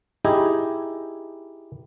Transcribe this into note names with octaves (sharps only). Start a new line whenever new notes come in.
D#4 E4 G4 G#4 D#5